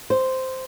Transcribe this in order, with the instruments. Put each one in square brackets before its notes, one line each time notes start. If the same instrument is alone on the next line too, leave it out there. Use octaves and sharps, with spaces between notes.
[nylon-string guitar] C5